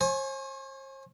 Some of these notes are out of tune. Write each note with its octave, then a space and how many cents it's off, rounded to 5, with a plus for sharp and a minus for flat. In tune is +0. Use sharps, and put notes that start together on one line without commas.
C5 +45 G#5 +15 C#6 +0